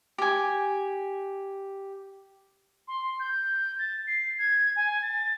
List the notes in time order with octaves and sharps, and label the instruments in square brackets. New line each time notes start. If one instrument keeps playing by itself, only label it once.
[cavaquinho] G4 G#5
[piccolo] C6
G6
A6
C7
G#6
G#5
A6